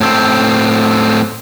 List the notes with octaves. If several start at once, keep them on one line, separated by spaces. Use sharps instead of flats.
A2 C4